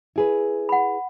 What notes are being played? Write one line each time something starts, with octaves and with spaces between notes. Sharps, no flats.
E4 G#4 B4
F#5 B5